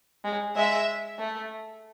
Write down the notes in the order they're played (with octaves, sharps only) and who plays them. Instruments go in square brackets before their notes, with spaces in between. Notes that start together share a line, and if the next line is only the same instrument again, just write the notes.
[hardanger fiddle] G#3
[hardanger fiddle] G#3 [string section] E5
[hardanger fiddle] A3